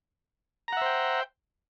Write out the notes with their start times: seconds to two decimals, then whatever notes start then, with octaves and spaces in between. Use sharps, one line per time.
0.68 A#5
0.73 F#5
0.77 E5
0.81 C5
0.86 G5